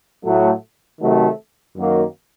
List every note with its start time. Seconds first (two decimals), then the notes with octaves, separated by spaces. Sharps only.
0.25 A2 F#3 A3
1.01 C3 D#3 F#3 A3
1.77 F#2 D#3 F#3 A#3